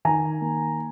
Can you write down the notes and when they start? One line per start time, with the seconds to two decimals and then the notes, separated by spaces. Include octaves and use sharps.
0.05 D#3 G#5 A#5
0.41 A#3